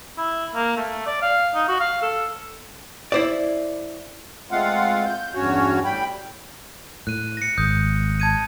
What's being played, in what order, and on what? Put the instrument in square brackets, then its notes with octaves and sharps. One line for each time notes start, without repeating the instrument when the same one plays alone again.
[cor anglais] E4
A#3
A3
D5
F5
D#4
F#4
F5
A4
[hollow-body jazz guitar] E4 C5 D5
[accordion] G#3 A3 C4 F4 F5 F#5
G6
E2 G2 C#4 F#4 C#5
A2 G3 G5 B5
[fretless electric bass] A2 [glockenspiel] F#6 D#7
[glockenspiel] A#6 C#7
[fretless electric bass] G#1 [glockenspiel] D#6 G6
[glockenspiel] A5 G#6 D#7